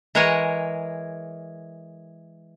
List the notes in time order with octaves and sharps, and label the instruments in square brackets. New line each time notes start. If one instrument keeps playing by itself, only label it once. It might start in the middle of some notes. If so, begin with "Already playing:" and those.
[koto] E3 G#3 A#4 C#5 F#5 G#5